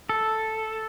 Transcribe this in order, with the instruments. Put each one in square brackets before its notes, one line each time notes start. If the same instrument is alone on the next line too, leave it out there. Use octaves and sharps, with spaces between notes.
[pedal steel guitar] A4